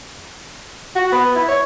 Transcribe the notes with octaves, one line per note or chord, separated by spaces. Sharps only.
F#4
B3
E4
C#5